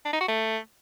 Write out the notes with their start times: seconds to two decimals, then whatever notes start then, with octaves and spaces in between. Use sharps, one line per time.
0.05 D4
0.13 D#4
0.21 F#4
0.28 A3